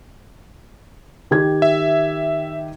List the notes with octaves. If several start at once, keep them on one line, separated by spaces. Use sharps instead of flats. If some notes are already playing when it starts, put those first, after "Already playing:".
D#3 G4 G#6
E5